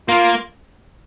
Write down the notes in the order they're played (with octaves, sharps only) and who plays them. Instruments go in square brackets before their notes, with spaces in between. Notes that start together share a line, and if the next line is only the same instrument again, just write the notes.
[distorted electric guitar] A#3 [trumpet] F4